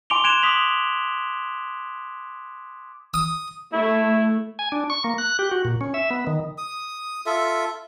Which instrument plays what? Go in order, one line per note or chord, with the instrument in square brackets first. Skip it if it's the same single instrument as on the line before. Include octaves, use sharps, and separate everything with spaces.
[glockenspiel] G#5 C6 D6 D7 F7 G7
C6 F#6 G#6 D7 E7 F7
D6 D#6 B6 F7 F#7
[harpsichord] D#6
[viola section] A3 [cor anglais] E4
[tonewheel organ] G#5
D4
C#6
A#3
F#6
G4
F#4
A#2
C#4
E5
B3
D#3
[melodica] D#6
F4 A4 E5